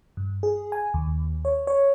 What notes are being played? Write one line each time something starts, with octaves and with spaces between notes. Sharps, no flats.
G2
G#4
G#5
D#2
C#5
C#5